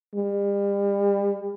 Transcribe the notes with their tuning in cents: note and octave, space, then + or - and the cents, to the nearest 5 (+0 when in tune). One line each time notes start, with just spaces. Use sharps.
G3 +35